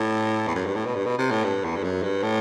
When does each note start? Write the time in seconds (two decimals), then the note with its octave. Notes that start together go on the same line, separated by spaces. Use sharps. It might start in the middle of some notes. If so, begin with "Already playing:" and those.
Already playing: A2
0.47 E2
0.55 F#2
0.66 G2
0.75 A2
0.85 B2
0.95 G2
1.06 B2
1.18 C3
1.31 A2
1.44 G2
1.65 E2
1.76 G2
1.84 F#2
2.03 G2
2.23 A2